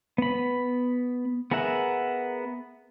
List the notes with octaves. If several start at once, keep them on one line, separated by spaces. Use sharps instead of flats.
B3 B5
B3 G#4 A#4 E5 F#5